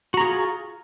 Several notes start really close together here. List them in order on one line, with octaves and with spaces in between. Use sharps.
F#4 A#5 G#4 F4